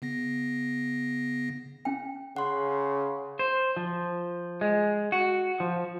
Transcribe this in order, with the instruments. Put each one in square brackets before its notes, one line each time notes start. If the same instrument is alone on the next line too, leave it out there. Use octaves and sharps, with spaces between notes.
[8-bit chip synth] C#3 B3 A#6
[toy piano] C#4 G5
[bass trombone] C#3 [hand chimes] F#5 C6
[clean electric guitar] C5
F3
G#3
F#4
F3